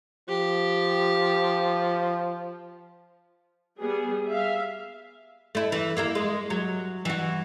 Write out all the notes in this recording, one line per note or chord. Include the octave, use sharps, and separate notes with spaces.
F3 G4
G3 B3 G#4
E5 F5
A3 E4
E3
A#3 E4 A#4
G#3
F#3
E3 F#4